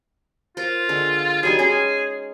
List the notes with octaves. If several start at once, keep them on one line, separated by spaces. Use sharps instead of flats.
F4 A#4 C5
D3 G#3
F#3 G3 D#4 G#4
G#3 C#4 G#4